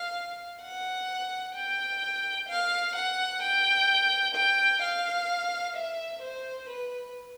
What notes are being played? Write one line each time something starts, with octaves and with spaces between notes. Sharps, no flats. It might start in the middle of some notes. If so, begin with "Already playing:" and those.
Already playing: F5
F#5
G5
F5
F#5
G5
G5
F5
E5
C5
B4